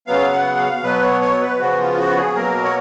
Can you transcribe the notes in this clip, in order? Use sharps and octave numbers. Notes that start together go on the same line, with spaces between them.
C#3 F#3 B3 F5
F#5
F5
B2 F#3 B3 B4
C#5
C#5
B4
C#3 F3 B3 F#4
F4
F#4
G#4
B2 F#3 A#3 A#4
C#5